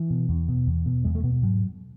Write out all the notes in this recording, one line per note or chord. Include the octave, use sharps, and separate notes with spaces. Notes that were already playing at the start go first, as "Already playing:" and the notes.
Already playing: E3
B2
E2
B2
E2
B2
E2 G#3
A3
B2 B3
G#2 F#3